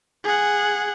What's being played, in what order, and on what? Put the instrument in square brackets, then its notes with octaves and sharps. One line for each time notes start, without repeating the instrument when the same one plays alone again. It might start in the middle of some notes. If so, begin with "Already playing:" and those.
[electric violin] G#4 F#5